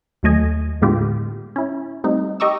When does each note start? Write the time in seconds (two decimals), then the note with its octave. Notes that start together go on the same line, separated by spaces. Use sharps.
0.23 D#2 F#3 A3 D#5 G#5
0.82 A2 D3 G#3 B3 F4 G4
1.56 C#4 E4
2.04 G3 A3 C4 D#4
2.40 G4 D#5 A#5 C#6 D6 E6